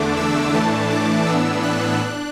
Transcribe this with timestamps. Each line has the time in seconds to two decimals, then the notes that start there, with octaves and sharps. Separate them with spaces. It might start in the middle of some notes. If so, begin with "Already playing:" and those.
Already playing: E2 D3 A3 D4 D6
0.17 E6
0.53 A2 E3 A3 D4 A5
0.91 D6
1.26 A2 E3 B3 D4 E6
1.63 F#6
1.99 D4 F#6